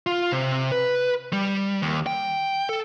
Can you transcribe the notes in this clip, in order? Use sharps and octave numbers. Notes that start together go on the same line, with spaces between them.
F4
C3
B4
G3
D#2
G5
A4